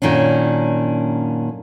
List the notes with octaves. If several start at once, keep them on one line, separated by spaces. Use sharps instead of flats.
F#2 A#2 D#3 C#4 D4